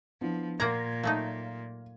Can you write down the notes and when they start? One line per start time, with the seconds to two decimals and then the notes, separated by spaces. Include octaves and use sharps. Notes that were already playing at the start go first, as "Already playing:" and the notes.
0.21 F3 B3 D4 E4
0.60 A#2 A#3 F#5 A#5 C6 G#6 A#6
1.03 F#3 A3 D#4 F5